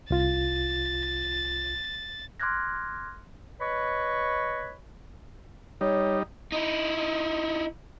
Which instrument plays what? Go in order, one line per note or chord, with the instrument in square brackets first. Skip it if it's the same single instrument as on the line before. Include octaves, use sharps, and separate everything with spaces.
[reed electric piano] C2 F4 [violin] A6
[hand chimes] C6 D6 F6 F#6 G#6 A#6
[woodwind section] B4 C#5 D#5 B5 C#6
[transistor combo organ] G3 D#4 [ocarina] C#5
[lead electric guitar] D#4 E4